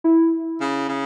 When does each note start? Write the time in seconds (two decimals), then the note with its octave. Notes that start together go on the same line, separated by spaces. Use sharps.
0.04 E4
0.61 C#3
0.89 C#3